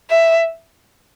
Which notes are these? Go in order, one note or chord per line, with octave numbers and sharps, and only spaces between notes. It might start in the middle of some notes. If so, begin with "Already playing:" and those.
E5